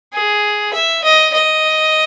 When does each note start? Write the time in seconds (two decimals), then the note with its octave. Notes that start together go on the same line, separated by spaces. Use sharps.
0.13 G#4
0.73 E5
1.04 D#5
1.33 D#5